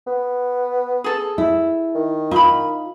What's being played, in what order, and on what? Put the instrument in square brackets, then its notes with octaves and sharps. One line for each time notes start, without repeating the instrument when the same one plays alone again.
[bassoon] B3
[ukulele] G#4 A4
[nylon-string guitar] E4
[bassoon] D#3
[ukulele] D#4 B5 [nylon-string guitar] F4